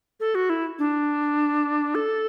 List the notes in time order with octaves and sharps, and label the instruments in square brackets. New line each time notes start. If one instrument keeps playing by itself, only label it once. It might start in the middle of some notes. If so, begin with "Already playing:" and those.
[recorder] A4
F#4
E4
D4
A4